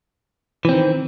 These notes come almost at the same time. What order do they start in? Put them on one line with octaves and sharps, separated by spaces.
E3 C4 D#3